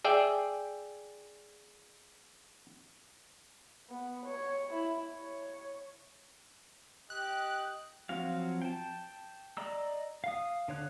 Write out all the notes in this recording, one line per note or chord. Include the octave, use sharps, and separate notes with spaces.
G#4 D5 E5 G5
B3
C#5
E4
C#5
G4 D#5 F#6
F3 F#3 C4 F#4 F5
G5 A5
D5 D#5 A#5 E6
F5 D#6
D3 C#5 F#6